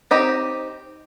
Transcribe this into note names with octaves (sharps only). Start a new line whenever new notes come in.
C4 D#4 G4 D#5